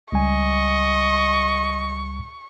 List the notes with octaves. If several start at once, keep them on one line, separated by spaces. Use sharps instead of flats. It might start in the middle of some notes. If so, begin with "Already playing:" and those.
C#2 G3 D#5 G#5 C#6